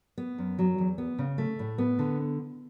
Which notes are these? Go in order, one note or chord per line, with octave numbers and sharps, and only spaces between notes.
B3
F#2
F#3
E2
B3
C#3
A3
A2
B3
D3